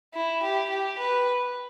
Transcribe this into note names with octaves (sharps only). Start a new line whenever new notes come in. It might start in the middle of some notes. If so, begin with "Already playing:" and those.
E4
G4
G4
B4